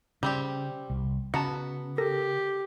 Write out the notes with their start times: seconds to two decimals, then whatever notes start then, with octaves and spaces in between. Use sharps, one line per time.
0.23 C#3 G3 C4 G4
0.90 C2
1.34 C#3 B3 F#4 A5 A#5 C#7
1.98 G4 A4 A#4 A#6